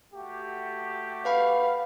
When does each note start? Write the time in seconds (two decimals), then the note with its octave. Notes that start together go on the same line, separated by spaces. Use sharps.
0.13 A3 F#4 G4
1.25 B4 F5 F#5 B5